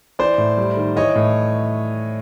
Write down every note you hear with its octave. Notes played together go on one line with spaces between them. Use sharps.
E3 C5 D5
A2
G3
D#3
E3 C#5 D#5
A2